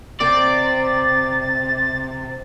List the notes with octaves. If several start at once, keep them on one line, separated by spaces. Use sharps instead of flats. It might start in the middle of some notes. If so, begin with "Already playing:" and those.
C3 C4 D5 A6